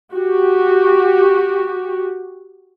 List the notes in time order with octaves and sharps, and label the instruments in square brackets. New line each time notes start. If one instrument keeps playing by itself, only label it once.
[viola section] F#4 G4